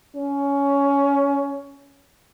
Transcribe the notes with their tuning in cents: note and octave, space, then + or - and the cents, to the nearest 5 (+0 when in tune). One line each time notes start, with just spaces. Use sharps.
C#4 +15